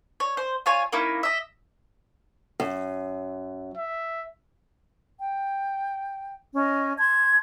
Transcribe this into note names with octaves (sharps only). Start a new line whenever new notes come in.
C#5
C5
F4 C#5 G#5
A#3 C#4 D#4 E4
D#5 E5
F#2
E5
G5
C#4 D#5
A5 C6 G#6